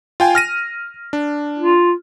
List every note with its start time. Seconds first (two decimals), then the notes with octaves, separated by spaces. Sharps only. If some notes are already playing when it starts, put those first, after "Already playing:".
0.20 F4 G5 G#5
0.35 F6 A#6 D#7
1.13 D4
1.59 F4